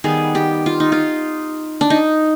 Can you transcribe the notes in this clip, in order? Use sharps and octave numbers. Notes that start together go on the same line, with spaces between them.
D#3 G3 B3 G#4
G4
F4
D#4
F4
D4
D#4